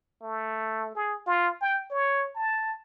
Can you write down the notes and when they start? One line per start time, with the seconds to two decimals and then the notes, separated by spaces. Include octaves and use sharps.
0.23 A3
0.95 G#4
1.27 F4
1.61 G5
1.91 C#5
2.35 A5